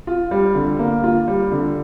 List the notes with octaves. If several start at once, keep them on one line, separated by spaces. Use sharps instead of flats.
F4
G3
D3
A#3
F4
G3
D3